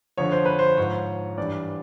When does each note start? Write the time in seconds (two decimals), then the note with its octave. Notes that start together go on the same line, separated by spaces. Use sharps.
0.17 F2 D3 F3 C#5
0.32 C5
0.45 B4
0.59 C5
0.77 G#2 F3 C#5
1.38 G2 E3 D5